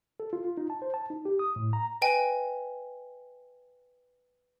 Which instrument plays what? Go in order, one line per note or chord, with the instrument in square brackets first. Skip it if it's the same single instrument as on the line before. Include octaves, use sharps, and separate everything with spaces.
[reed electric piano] A4
F4
F4
D#4
A5
C5
A5
D#4
G4
D#6
A2
A#5
[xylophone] B4 D#5 G5 G#5